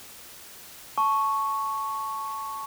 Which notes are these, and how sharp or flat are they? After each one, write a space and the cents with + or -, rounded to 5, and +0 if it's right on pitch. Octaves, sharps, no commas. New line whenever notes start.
A5 -10 C#6 +0